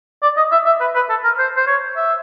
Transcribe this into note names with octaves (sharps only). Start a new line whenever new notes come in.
D5
D#5
E5
E5
B4
B4
A4
A#4
C5
C5
C#5
E5